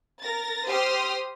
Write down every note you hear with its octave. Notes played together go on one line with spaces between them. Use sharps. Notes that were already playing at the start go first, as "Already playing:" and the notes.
A#4 A6 A#6
G4 C5 C6 D#6 F6